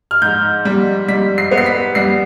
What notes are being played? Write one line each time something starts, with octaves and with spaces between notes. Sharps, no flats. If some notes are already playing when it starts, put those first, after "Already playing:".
F6
G#2 G6
G3
G3 B6
C7
B3
C7
B6
G3 C7